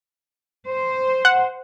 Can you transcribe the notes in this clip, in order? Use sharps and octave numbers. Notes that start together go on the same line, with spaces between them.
C5
F#5